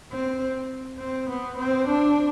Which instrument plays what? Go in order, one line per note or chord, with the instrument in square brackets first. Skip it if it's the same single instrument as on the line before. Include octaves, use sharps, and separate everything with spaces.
[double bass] C4
C4
B3
C4
D4